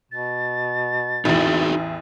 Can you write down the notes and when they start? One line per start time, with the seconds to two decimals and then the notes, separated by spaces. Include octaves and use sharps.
0.12 B2 A6
1.25 A1 E2 D#4 F#4 G#4